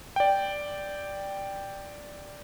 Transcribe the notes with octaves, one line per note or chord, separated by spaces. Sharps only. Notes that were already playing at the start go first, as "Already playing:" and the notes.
D5 G5